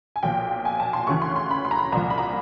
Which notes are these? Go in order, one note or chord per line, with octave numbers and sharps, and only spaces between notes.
G#5
B1 A#2 F3 G5
G#5
A5
C6
D2 C#3 E3 C#6
C6
C6
B5
C6
A#5
B5
C2 A#2 F3 A#5
B5
A#5